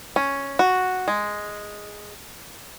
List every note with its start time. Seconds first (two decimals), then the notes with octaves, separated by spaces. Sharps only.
0.16 C#4
0.59 F#4
1.08 G#3